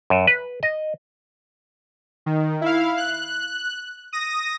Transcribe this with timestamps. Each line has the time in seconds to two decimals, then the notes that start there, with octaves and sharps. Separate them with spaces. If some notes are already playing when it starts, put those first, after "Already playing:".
0.10 F#2
0.27 B4
0.63 D#5
2.26 D#3
2.61 E4 F5
2.97 F#6
4.13 D#6 A#6